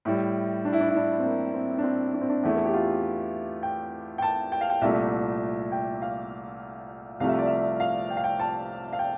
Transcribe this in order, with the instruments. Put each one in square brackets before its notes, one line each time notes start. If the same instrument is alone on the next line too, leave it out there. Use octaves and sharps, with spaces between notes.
[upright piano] A2 G3 E4
D4
E4
D4
E4
D4
C4
A#3
C4
D4
C4
D4
C4
D4
E2 E3 A3 E4
A4
G4
F4
G5
G5
A5
G5
F5
G5
C2 A#2 A3 E5
G5
F5
C2 C3 F3 A3 F5
E5
D5
E5
F5
G5
F5
G5
A5
F5
G5